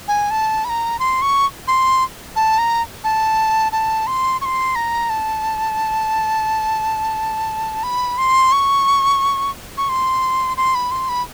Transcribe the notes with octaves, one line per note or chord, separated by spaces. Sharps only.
G#5
A5
B5
A#5
C6
C#6
C6
A5
A#5
A5
A5
C6
C#6
C6
A#5
A5
B5
C6
C#6
C#6
C6
C6
B5
C6
B5